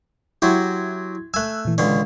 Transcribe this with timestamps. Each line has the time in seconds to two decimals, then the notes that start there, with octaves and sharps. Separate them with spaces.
0.42 F#3 E4 F#4 G4 C6 G#6
1.34 A3 G#5 E6 F#6
1.65 A#2 E3
1.78 C#2 D3 C#4